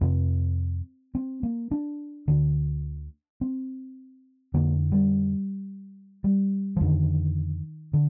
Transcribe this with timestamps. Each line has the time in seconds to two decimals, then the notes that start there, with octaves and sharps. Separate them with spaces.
0.01 F2 C3 C4
1.15 C4
1.43 A#3
1.71 D4
2.28 D2 D3
3.41 C4
4.54 F2 D3 A#3
4.92 G3
6.24 G3
6.77 F3
6.81 F2 D3 D#3
7.93 D3